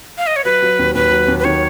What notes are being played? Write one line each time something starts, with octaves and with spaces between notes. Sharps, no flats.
F5
D#5
C#5
F#3 B4
F#3
D#2
D#2 B4
F#3
D#2
B4
D#3 C#5